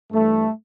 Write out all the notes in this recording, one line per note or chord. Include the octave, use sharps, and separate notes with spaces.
G2 E3 G3 A3